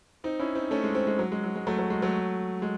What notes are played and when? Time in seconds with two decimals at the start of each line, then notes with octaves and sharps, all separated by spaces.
0.24 C4 D#4
0.39 C#4 E4
0.55 C4 D#4
0.71 A3 C#4
0.83 G#3
0.95 G#3 C4
1.07 G#3
1.19 F#3
1.32 G#3
1.44 F#3
1.55 G#3
1.67 F#3 A3
1.79 F#3
1.90 G#3
2.02 F#3 A3
2.62 G#3